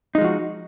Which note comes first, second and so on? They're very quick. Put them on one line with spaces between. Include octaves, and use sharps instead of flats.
D#4 G#3 F3 F#4